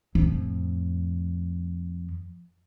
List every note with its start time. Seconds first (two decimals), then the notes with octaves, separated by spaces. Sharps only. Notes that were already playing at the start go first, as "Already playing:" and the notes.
0.15 F2 A2